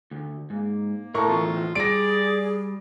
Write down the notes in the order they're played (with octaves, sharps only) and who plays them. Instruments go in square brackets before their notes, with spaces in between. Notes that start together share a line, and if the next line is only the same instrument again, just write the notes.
[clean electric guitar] D2
[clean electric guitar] G#2 [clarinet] A#3
[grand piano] A2 A#5 C#6 [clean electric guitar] A#4 A5
[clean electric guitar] E2 C4 [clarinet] F4
[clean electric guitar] G3 [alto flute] G#4 [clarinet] D5 [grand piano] A#6 D7